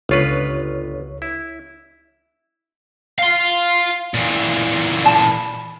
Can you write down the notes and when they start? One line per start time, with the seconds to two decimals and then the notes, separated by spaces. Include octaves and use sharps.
0.09 G1 C#2 F4 B4 C#5
1.22 E4
3.19 F5 C6
4.14 A#2 E3
5.04 D5 A5 B5